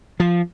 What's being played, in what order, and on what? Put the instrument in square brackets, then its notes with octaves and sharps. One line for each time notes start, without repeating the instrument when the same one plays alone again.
[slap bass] F3